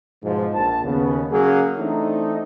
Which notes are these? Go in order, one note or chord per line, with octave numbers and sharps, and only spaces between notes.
G#2 B2 F3 G#3
A#1 A5
D#2 C#3 B3
C#3 F#3 A#3 C#4 G#4
E3 A3 C4 D4 D#4